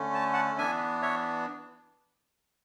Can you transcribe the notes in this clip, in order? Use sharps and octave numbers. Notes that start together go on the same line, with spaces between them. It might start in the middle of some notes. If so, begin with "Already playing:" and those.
Already playing: D3 A3 C#4
A5
F#5 A5
E3 B3 D4 E5 G#5
C#5 E5